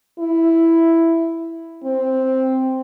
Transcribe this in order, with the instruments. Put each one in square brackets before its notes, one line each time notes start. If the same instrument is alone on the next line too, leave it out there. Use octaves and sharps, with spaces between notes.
[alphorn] E4
C4